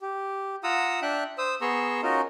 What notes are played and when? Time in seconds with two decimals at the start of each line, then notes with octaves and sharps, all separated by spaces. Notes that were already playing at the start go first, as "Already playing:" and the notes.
0.01 G4
0.64 F4 F#5 A#5 D#6 E6
1.02 D4 E5 G5 F#6
1.38 C5 D#6 E6
1.61 B3 G#4 A#5 C6 C#6 E6
2.03 C#4 D#4 F4 F#4 A#4 D#5